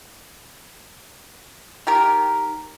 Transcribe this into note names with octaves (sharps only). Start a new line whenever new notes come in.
D#3 G4 A#4